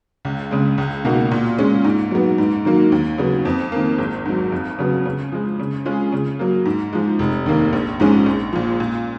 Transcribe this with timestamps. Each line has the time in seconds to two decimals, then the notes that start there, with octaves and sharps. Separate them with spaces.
0.25 C#2
0.51 C#3 G#3
0.78 C#2
1.05 B2 A#3 D#4 F#4
1.31 A#2
1.58 G#3 C#4
1.84 G#2
2.11 F#3 B3
2.38 G#2
2.65 D#3 F#3 A#3
2.92 D#2
3.18 C#3 F#3 B3
3.45 F2
3.72 D#3 A#3
3.98 G#1
4.25 G#2 F#3
4.52 F2
4.79 C#3 F#3 B3
5.05 C#3
5.32 F3 G#3
5.59 C#3
5.85 G#3 C#4 F4 G#4
6.12 C#3
6.39 F#3 A#3
6.65 G#2
6.93 F3 G#3
7.19 F1
7.46 D#2 D#3 A#3
7.73 A#1
8.00 G#2 F3 G#3 C#4
8.26 A#1
8.53 A#2 F3
8.80 A#2